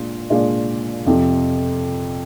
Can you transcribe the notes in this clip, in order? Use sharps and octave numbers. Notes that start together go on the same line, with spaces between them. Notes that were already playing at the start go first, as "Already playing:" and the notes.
Already playing: A#2 G#3 D4 F4
A#2 G#3 D4 F4
F2 C3 F3